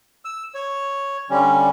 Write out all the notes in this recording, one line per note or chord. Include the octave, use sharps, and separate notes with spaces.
E6
C#5
D3 G3 C#4